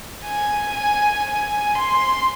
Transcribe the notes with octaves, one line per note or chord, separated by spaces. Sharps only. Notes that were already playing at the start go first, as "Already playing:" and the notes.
G#5
G#5
G#5
C6